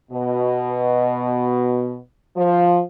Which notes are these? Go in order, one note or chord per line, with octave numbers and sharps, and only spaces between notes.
B2
F3